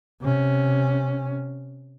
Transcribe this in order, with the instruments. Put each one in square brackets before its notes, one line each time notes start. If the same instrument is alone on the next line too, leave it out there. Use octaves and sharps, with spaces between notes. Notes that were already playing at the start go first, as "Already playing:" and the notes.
[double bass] C3 C#4